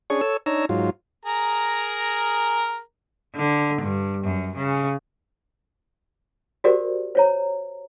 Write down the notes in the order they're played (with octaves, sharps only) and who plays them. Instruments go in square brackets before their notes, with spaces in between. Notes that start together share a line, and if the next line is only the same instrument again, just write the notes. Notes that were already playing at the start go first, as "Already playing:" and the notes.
[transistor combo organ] C#4 D4 G#4 C#6
A4 C#5 E6
D4 D#4 C#5 A#5 E6
G#2 F#3 F4
[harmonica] G#4 A#4 A#5
[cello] D3
G2
F#2
C#3
[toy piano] F#4 G4 A4 A#4 C5 D5
C5 C#5 A#5